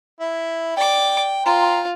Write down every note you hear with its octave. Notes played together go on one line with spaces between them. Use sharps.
E4
D5 G5 D6
F4 C5 G5 A#5